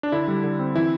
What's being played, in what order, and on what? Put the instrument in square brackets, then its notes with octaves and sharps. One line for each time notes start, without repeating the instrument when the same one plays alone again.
[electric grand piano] D4
D3 E4
G3
D3
C4
E3 E4